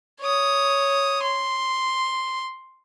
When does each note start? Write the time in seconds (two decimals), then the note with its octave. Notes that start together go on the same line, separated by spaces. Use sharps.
0.21 C#5 D#6
1.23 C6